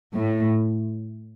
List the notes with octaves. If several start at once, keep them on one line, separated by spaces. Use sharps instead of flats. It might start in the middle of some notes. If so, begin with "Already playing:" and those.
A2